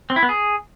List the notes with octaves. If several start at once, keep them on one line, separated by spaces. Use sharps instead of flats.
C4
E4
B3
G#4